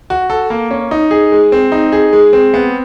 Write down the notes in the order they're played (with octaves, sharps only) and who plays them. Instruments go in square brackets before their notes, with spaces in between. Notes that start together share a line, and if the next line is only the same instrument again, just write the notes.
[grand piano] F#4
A4
A#3
C#4
D#4
G#4
G#3
C4
D#4
G#4
G#3
C4
B3